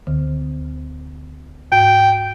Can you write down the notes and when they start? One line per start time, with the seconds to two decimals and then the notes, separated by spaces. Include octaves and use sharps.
0.07 D2 D3
1.72 G#2 G5